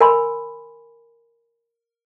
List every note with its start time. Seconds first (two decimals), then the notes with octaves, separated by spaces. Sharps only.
0.01 A#4 G#5 B5 C6